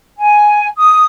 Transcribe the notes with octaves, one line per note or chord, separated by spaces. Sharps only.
G#5
D#6